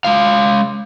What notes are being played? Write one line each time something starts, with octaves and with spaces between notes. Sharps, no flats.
G#3 F5